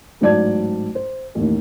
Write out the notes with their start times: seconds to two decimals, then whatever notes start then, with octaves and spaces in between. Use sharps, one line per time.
0.21 A1 G#2 F#3 D5 A5 G#6
0.95 C5
1.35 A1 D#2